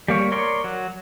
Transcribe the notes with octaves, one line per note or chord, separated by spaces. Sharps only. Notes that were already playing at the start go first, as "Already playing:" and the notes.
G3 A#3 C#5
A#4 C#5 D5 C6
F#3